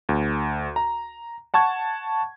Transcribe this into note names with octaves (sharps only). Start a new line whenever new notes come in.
D2
A#5
F#5 A5 C#6 G#6